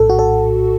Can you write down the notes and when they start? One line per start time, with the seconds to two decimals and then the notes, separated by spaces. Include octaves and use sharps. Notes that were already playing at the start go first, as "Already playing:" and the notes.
Already playing: A#1 A2 A4
0.10 F#4
0.19 A4